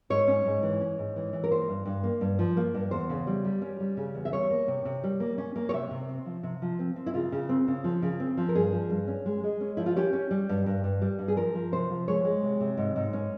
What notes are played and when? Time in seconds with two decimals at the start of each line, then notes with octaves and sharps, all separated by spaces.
0.10 G#2 C#5
0.27 C#4
0.46 G#2
0.63 E3
0.81 C#4
0.98 G#2
1.16 E3
1.33 E3
1.44 A#4
1.51 A#3 C5
1.69 G2
1.86 G2
2.03 A#3
2.21 G2
2.39 F3
2.57 A#3
2.74 G2
2.91 E2 C5
3.09 C#3
3.27 G3
3.44 G3
3.61 C#4
3.80 G3
3.97 C#3
4.15 E2
4.25 E5
4.32 G3 C#5
4.50 A#3
4.68 C3
4.85 C3
5.04 G3
5.20 A#3
5.38 C#4
5.56 A#3
5.69 C#5
5.73 C3 E5
5.91 C3
6.09 C4
6.26 F3
6.43 C3
6.62 F3
6.79 C4
6.96 C4
7.06 E4
7.14 C#3 F4
7.32 C#3
7.49 C4
7.68 C#3
7.84 F3
8.02 C#3
8.20 C4
8.37 F3
8.49 A#4
8.55 G2 G#4
8.72 F3
8.90 G2
9.07 C#4
9.26 G#3
9.44 G#3
9.61 C#4
9.77 F3 E4
9.86 F4
9.96 C#4 G4
10.13 C#4
10.31 G3
10.49 G2
10.66 G2
10.84 G2
11.02 G3
11.19 G2
11.28 G#4
11.36 F3 A#4
11.55 F3
11.72 C3 C5
11.90 F3
12.08 G#3 C#5
12.25 G#3
12.43 C3
12.60 C3
12.77 G#2
12.96 G#2
13.13 C#4